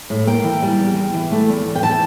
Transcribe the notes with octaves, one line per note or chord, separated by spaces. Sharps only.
A2
A#3 G5
E3
G3
E2
E2
E3
A3
E2
E2
G5
E3 A5